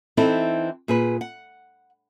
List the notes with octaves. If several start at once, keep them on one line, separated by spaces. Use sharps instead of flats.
E3 C4 D#4 E4 A4
A#2 G#4 B4
F#5